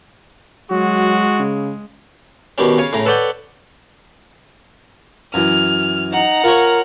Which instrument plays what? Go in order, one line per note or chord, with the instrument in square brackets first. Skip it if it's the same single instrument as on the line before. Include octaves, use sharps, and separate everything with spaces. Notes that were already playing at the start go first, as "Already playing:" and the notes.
[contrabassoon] F#3 [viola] G#3 [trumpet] F#4
[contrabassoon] C#3
[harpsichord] B2 D#3 G3 C#4
C#3 C#5 F5 G#5
A2 C#3 A#5
A4 B4 C#5 D5 F#5 G5
[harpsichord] F#2 E3 [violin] F6
[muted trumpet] D#4 [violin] F#5 A#5
[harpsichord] F4 C#5 [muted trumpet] A#4